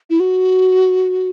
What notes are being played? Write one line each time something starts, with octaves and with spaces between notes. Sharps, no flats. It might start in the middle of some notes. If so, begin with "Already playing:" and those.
E4
F#4